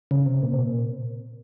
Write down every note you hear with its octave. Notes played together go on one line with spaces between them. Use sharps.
C#3
C3
A#2
C3
A#2